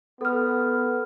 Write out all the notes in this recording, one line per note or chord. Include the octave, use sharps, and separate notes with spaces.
B3 A4 F6